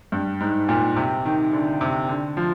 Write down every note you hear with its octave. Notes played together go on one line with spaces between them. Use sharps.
G2
G#2
A#2
C3
D#3
D3
C3
D3
F3